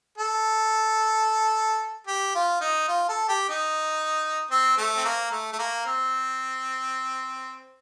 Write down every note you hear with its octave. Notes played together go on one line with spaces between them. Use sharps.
A4
G4
F4
D#4
F4
A4
G4
D#4
C4
A3
C4
A#3
A3
A3
A#3
C4